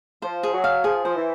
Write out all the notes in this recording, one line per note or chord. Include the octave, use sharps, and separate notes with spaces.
F3 C5
G#4
F#3
F5
F3 G#4
F3 C5
E3